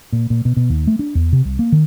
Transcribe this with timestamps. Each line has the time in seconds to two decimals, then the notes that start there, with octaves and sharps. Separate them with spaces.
0.13 A#2
0.30 A#2
0.45 B2
0.57 B2
0.70 D#2
0.87 A3
0.99 D4
1.15 E2
1.32 C3
1.45 C2
1.59 A#3
1.72 D#3